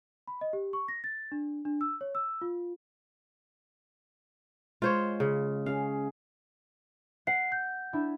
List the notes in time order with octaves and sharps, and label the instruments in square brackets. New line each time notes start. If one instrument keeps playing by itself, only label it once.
[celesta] B5
D#5
G4
C#6
A#6
A6
D4
D4
E6
C#5
E6
F4
[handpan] G#3 [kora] F4 C5 C#5
[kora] C#3
[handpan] C#4 G#4 [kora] F5
[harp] F#5 [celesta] C7
[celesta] G6
[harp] D4 E4